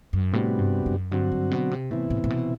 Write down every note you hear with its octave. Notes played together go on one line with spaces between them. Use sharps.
F#2
A2 C3 G3 B3 D4 F#4
G2
F#2
G2 D3 F#3 C4 F#4
G2
B2
C3
A2 C3 E3 B3 E4
A2
A2
B2